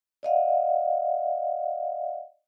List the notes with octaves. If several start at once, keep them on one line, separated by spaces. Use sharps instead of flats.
D5 D#5 F5 F#5